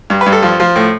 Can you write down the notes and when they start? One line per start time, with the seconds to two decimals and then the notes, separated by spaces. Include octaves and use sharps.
0.10 G2
0.21 B4
0.26 G2
0.32 A4
0.42 F3
0.60 F3
0.76 A2